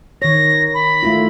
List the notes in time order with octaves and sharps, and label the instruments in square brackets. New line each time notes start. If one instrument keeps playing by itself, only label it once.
[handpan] D#3 C#5 [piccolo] A#6
[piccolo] B5
[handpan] A3 E4 F4